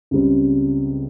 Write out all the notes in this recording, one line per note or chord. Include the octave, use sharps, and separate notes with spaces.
C#2 C#3 G3 C4